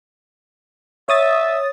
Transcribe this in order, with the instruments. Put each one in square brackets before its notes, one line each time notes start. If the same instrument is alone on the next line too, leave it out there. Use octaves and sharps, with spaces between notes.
[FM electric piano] C#5 D#6 A6 [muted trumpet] E5